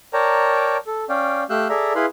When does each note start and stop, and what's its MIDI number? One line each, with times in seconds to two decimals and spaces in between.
0.13 0.77 70
0.13 0.77 73
0.13 0.77 74
0.13 0.77 79
0.13 0.77 81
0.13 0.77 82
0.87 1.05 69
1.09 1.43 61
1.09 1.43 74
1.09 1.43 77
1.09 1.43 79
1.50 1.68 57
1.50 1.68 67
1.50 1.68 77
1.50 1.68 88
1.50 1.68 90
1.50 1.68 91
1.70 1.93 68
1.70 1.93 69
1.70 1.93 74
1.70 1.93 76
1.70 1.93 82
1.95 2.06 64
1.95 2.06 68
1.95 2.06 71
1.95 2.06 77
1.95 2.06 83
1.95 2.06 84